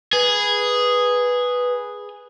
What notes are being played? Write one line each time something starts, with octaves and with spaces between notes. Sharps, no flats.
G#4 B4